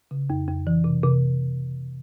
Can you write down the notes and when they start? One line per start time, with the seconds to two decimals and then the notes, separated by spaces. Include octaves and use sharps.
0.11 C#3
0.30 F2
0.48 F2
0.67 E3
0.84 C3
1.03 C3